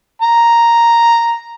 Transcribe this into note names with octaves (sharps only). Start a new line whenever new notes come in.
A#5